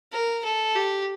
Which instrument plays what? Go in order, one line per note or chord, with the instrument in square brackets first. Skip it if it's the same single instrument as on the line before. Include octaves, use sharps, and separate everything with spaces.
[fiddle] A#4
A4
G4